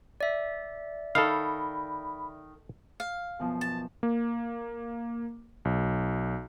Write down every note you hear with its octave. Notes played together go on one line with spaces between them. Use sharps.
D5 E5
D#3 A4 F5 B5
F5
F#2 B2 F3
A5
A#3
B1